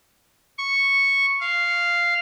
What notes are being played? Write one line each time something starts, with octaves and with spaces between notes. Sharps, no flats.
C#6
F5